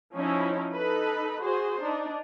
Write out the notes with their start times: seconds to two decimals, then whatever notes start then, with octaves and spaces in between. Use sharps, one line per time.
0.15 F3 C#4 D#4 E4
0.74 D#4 A4 B4
1.42 F#4 G#4 C5
1.81 D4 D#4